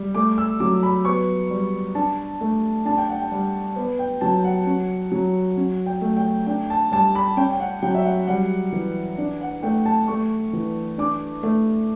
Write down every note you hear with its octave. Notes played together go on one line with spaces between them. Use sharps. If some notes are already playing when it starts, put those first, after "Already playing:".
Already playing: G3
A3 D6
E6
F#3 D6
B5
B3 C#6
G3
D4 A5
A3
D4 A5
G5
F#5
G5
G3
B3
G5
F#3 A5
G5
F#5
C#4
F#3
C#4
G5
A3
G5
D4 G5
A5
G3 A5
B5
C#4 G5
G5
F#5
F#3 G5
E5
F#5
G3 F#5
E3
D4
F#5
A3 G5
A5
A3 C#6
E3
D4 D6
A3